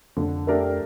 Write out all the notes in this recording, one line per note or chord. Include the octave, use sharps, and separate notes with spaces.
F2 D3
A3 D4 G4 A#4